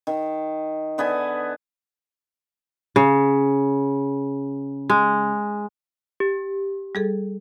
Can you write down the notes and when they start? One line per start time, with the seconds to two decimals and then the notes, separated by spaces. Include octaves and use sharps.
0.07 D#3
0.98 D3 B3 E5 G#5
2.96 C#3
4.90 G#3
6.20 G4
6.95 G3 G#4 A4